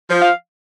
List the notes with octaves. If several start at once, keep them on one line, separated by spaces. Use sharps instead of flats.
F3
F5